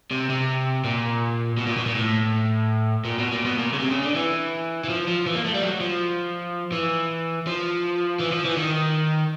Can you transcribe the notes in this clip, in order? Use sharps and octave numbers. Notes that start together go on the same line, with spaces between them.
C3
C3
A#2
B2
A#2
B2
A#2
A2
A#2
B2
A#2
B2
A#2
C#3
C3
C#3
D3
E3
E3
F3
F3
E3
A#3
A3
G3
F#3
F3
E3
F3
E3
F3
E3
D#3